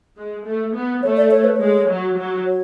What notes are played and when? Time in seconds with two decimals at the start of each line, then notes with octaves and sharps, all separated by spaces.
0.17 G#3
0.46 A3
0.75 B3
1.02 A3 C#5
1.17 D5
1.31 C#5
1.44 B4
1.56 G#3 C#5
1.89 F#3
2.18 F#3
2.45 C#5